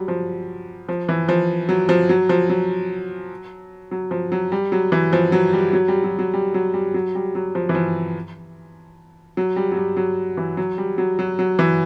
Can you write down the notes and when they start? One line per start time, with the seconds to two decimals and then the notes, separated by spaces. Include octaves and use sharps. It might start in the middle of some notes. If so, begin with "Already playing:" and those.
Already playing: F#3 G3
0.08 F3
0.89 F3
1.09 E3
1.29 F3
1.69 F#3
1.89 F3
2.09 F#3
2.29 F3
2.49 F#3
3.91 F#3
4.11 F3
4.32 F#3
4.52 G3
4.72 F#3
4.92 E3
5.13 F3
5.32 F#3
5.53 G3
5.73 F#3
5.88 G3
6.04 F#3
6.19 F#3
6.34 G3
6.54 F#3
6.74 G3
6.94 F#3
7.15 G3
7.35 F#3
7.55 F3
7.69 E3
7.74 F3
9.37 F#3
9.56 G3
9.72 F#3
9.77 G3
9.97 F#3
10.37 E3
10.57 F#3
10.78 G3
10.98 F#3
11.19 F#3
11.39 F#3
11.59 E3